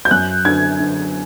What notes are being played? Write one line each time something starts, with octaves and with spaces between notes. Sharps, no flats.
G6
F#2 F#6
D3 G#6
D3